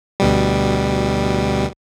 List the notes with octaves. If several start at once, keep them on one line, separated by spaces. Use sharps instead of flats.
D2 B2 G3